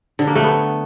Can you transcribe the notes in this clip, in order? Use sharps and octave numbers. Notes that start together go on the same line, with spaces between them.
D3
A#3
A3
B3